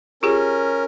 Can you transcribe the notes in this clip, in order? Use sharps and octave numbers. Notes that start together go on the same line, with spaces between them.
C#4 F4 G4 G#4 A#4